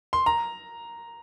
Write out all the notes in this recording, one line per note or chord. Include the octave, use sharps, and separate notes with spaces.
C6
A#5